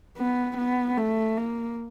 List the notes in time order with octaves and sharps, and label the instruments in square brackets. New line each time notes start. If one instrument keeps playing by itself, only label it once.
[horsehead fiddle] B3
B3
A3
A#3